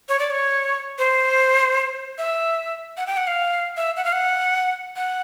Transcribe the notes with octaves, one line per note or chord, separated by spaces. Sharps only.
C#5
D5
C#5
C5
E5
F#5
G5
F#5
F5
E5
F#5
F5
F#5
F#5